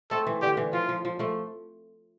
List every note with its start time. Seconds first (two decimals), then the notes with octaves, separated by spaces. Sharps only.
0.11 A3 C4 A4
0.27 E3
0.42 D3 G4
0.57 E3
0.73 F3 F4
0.89 F3
1.05 F3
1.19 F3 A3